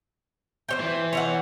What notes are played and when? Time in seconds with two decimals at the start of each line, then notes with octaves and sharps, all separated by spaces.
0.69 C5 C#5 G5
0.80 E3
1.13 C#5 E5 F#5